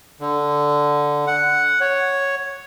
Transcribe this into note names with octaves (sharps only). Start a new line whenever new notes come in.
D3
F#5
C#5